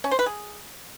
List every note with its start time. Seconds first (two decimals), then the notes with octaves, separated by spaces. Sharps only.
0.04 C#4
0.11 C5
0.19 B4
0.26 G#4